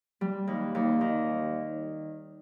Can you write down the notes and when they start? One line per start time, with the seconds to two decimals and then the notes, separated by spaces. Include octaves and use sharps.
0.21 G3
0.47 D#2
0.75 D#2
1.01 D#3